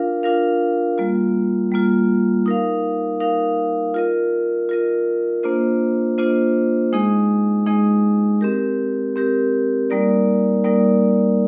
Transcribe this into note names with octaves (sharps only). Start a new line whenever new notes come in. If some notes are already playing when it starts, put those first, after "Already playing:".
Already playing: D4 F4 A#4 F5
D4 F4 A#4 F5
G3 A#3 F4
G3 A#3 F4
D#4 A#4 F5
D#4 A#4 F5
F4 A#4 D#5
F4 A#4 D#5
A#3 D4 F4 C5 D#5
A#3 D4 F4 C5 D#5
G#3 D#4 G#4 D#5
G#3 D#4 G#4 D#5
C4 G4 A#4
C4 G4 A#4
G3 A#3 D#4 A#4 D5
G3 A#3 D#4 A#4 D5